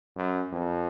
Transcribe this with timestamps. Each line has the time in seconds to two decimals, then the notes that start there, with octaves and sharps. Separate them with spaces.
0.16 F#2
0.52 F2